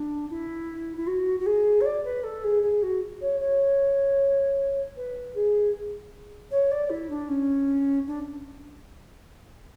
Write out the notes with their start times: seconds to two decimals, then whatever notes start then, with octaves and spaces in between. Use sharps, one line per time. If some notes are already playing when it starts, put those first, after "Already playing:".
Already playing: D4
0.30 E4
0.97 E4
1.07 F#4
1.40 F#4
1.46 G#4
1.81 C#5
1.85 D5
2.04 B4
2.23 A4
2.44 G#4
2.62 G#4
2.82 F#4
3.21 C#5
3.40 C#5
4.96 B4
5.35 G#4
6.51 C#5
6.71 D5
6.90 E4
7.10 D4
7.29 C#4
8.07 D4